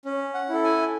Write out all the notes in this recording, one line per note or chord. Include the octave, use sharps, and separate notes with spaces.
C#4
F#5
E4 A4
G#5